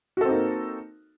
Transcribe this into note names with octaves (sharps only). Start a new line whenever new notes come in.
A#3 C4 D#4 F#4 A4